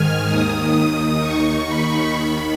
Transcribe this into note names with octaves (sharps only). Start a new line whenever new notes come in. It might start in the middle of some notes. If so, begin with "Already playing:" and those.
Already playing: G#2 D#3 G#5 F6
D#2 D#3 D#6
D#6
D#2 D#3 C#6
B5
D#2 D#3 B5